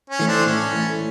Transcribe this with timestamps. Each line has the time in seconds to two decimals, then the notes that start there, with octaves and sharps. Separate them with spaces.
0.10 C#4
0.19 E3 A3
0.28 C4 D4
0.46 A2 C#4
0.72 E3 A3